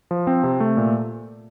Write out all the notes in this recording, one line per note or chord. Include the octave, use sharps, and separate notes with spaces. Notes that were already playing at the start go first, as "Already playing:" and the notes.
F3
C4
C3
A3
A#2